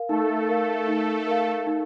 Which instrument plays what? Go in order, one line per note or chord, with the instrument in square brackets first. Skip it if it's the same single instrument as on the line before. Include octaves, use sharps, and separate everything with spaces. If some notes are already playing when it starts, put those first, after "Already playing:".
Already playing: [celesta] A#4 F5
[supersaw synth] A3 A4 [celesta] D#4
[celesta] A#4 F5
D#4
A#4 F5
D#4